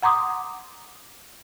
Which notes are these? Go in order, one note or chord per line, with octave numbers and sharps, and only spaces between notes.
F#5 A#5 C6 D6 D#6